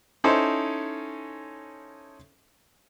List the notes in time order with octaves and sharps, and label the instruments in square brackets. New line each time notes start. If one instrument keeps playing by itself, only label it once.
[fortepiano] C#4 D#4 E4 A4 C5